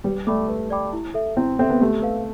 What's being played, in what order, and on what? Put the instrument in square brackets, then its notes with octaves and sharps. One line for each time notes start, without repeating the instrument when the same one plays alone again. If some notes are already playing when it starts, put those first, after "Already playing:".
[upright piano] G3 [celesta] B4
[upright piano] A3 [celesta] D5 G5 B5 D6
[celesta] B4
D5 G5 B5 D6
E4
A4 E5
[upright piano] C4 [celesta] E4
[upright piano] C4 [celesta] A4 E5
[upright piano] B3
[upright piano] A3 [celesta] G4
[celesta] B4 F5